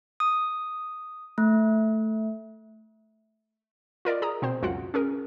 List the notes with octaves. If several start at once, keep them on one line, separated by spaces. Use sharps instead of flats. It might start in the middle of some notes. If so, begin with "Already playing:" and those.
D#6
A3
F4 A#4 D5 D#5
G#4 A#5 D#6
B2 C4 C5
C#2 F#2 F4 F#4 F#5
C#4 G#4 A#4